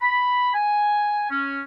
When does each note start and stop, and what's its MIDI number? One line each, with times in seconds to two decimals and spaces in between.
0.02 0.52 83
0.54 1.29 80
1.30 1.61 61